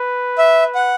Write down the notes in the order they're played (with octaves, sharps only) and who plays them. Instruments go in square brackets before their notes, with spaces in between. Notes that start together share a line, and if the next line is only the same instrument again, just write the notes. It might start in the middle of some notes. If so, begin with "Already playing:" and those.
Already playing: [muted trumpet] B4
[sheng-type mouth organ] E5
F#5